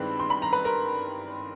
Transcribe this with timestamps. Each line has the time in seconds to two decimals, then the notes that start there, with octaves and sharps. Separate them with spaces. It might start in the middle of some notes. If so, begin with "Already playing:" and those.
Already playing: G2 D#3 G#3 C4 E4 B4 B5
0.20 C6
0.30 B5
0.42 A#5
0.53 B4 B5
0.65 A#4 A#5